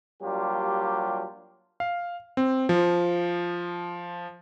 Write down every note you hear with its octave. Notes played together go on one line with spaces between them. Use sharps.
F#3 G3 A#3 D4 F4 G4
F5
C4
F3